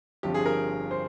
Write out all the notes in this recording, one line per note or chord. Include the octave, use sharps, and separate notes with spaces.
G1 G2 F3 C4 G4
G#4
A#4
C5